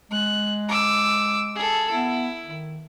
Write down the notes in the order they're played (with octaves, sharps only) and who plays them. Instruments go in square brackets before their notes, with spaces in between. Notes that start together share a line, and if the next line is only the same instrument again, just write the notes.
[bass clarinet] G#3 [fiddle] F#6
[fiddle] D6 E6
G#4 A4
[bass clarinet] B3 [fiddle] E4
[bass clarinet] D#3